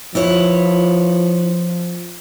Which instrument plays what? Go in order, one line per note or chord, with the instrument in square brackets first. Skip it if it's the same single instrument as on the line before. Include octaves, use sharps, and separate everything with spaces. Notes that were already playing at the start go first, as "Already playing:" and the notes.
[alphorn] F3 [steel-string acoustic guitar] E4 B4 C#5